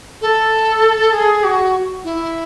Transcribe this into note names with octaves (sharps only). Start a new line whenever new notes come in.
A4
G#4
F#4
E4